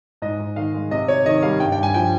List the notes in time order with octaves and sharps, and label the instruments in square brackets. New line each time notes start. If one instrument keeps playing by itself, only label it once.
[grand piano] G#2 D#5
G#2
D#3 F5
G#3
C3 D#5
C3 C#5
D#3 D#5
G3 F5
G2 G5
G5
G2
G#5
F3 G5